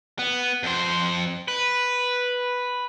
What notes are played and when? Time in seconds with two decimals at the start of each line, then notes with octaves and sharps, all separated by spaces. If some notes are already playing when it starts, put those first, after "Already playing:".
0.19 B3
0.63 F2 C5
1.48 B4